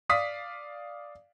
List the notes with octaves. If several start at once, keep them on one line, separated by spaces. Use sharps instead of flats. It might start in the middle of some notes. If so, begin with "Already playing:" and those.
D5 F5 D#6 B6